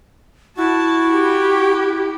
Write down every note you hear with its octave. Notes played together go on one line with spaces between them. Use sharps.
E4 F#4 A5
G4